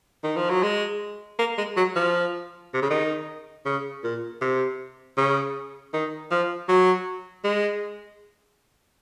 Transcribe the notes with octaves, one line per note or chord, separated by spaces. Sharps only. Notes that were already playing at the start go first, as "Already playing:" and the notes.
D#3
F3
F#3
G#3
A#3
G#3
F#3
F3
C3
C#3
D#3
C#3
A#2
C3
C#3
D#3
F3
F#3
G#3